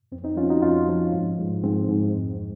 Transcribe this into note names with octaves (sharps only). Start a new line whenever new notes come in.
F2 C4
C4 D#4
F3 C#4 F4
D#4 F#4
F2 C#4 F4
F3
G#2
G#2
G#2 C4
G#2
F2